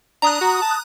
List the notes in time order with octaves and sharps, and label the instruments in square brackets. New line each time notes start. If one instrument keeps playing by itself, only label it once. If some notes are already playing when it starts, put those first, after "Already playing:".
[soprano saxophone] D4 [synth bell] A#5 D#6 F#6
[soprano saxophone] F#4
A5